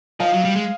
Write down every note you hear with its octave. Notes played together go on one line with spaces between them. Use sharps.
F3 D#5 F5
F#3
G3
G#3